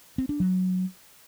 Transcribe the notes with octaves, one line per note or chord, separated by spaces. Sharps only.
C4
D4
F#3